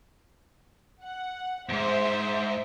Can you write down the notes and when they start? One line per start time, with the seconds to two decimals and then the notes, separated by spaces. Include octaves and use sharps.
1.03 F#5
1.69 D#2 G#2 C5 E5